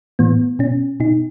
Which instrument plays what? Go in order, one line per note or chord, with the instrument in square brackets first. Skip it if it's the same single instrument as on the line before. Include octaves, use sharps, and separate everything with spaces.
[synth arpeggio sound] A2 E3 B3
B2 C#4
B2 D#4